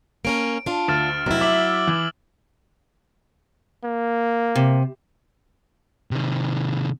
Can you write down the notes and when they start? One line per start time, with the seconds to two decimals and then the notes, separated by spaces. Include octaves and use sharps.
0.25 A#3 C#4 A#4 D7
0.66 D4 F4
0.88 D2 F6 A6 E7
1.26 F1 F#3 E4
1.41 E5 D6 E6 F#7
1.87 E3
3.84 A#3
4.55 C3
6.11 C3 D#3